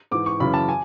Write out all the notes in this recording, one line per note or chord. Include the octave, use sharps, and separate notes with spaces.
G#2 E3 D6
C#6
F#2 C#3 E3 B5
A5
G#5